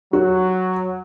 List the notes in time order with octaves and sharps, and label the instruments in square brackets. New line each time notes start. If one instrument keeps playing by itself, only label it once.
[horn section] F#3 [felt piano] F#4